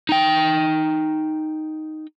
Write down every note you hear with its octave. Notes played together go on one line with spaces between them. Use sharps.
D#4 G5